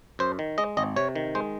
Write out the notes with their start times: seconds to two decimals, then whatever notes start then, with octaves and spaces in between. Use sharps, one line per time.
0.19 F#2 C5
0.39 D#3
0.58 G#3 D#5
0.77 G#1 D#5
0.96 C3 C#5
1.15 D#3
1.35 G#3 C5